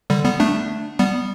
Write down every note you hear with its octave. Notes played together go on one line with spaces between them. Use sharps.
D3 G3
G3 B3
A3 D4
G3 B3